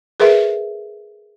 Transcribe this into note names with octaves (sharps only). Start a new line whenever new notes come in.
G#4 A#4 B4 E5